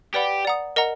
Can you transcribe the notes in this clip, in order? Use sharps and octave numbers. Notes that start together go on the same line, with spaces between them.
G4 B4 D5 F#5 B5
D5 F#5 A#5 D#6
A#4 D#5 F#5 A#5